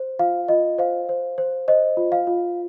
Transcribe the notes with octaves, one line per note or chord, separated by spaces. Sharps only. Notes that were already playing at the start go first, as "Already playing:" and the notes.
Already playing: C5
F4 F5
F4 D#5
C5 F5
C5
C5
C5 D#5
F4
F5
F4